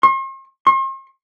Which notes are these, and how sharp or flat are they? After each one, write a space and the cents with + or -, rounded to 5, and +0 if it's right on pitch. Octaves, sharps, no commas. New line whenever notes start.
C6 +45
C6 +45